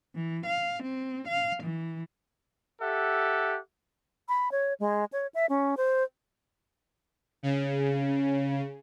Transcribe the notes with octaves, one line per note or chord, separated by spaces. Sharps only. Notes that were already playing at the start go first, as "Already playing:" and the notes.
E3
F5
C4
F5
E3
G4 A4 E5 F#5
B5
C#5
G#3
C#5
E5
C#4
C5
C#3